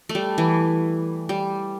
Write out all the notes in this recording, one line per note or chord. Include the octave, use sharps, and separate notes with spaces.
A3
G3
E3
G3